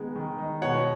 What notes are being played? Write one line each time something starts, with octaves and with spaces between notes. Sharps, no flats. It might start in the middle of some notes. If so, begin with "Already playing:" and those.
Already playing: D#3 G#3 B3 D#4
D#3
D#4
B2 C#5 F#5